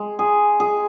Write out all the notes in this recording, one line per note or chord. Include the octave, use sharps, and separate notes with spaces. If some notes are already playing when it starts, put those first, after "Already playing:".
Already playing: G#3
G#4
G#4